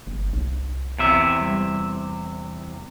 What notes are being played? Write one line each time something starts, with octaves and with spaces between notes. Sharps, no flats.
G1
C2
E2 C3 E5
G3